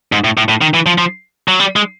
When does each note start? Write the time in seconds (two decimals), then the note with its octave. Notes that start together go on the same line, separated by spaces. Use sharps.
0.12 G#2
0.24 A2
0.37 A2
0.49 A2
0.61 D#3
0.74 E3
0.86 F3
0.98 F3
1.48 F#3
1.60 G3
1.76 G#3